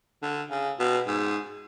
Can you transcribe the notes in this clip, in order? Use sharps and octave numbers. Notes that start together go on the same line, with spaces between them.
D3
C#3
B2
G#2